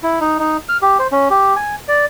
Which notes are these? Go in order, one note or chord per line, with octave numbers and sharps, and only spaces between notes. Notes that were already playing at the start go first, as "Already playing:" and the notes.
E4
D#4
D#4
F6
G4
C5
C#4
G4
G#5
D5